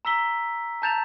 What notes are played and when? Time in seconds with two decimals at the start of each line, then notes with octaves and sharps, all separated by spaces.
0.05 A#5 E6 B6 G7
0.82 A5 A#5 G6 A6 E7 F7